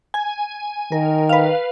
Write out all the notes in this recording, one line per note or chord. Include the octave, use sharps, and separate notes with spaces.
G#5
D#3 A#4
B4 F5